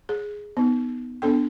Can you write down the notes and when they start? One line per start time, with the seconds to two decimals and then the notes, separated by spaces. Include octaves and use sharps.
0.09 G#4
0.57 B3 D#4
1.22 B3 D4 A4 G5